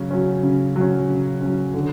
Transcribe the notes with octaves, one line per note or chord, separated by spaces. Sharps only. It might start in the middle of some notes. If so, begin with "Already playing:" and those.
Already playing: C#3 F#3 C#4
F#3 C#4
C#3
F#3
C#4
C#3
F#3 C#4
D3